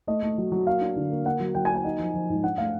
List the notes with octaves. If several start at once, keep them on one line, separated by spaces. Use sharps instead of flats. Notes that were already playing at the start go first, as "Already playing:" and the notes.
A3 D#5
A3
F#3
F#3
A#3 F5
D4
D3
A#3
A#3 F#5
F#3
F#3 G5
G#5
A#3
G#5
D#4
F3
F3
G#2
D4 F#5
A3 F5